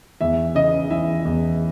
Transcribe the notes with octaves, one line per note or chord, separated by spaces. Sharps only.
E2 E5
C#3 D#5
E3 E5
E2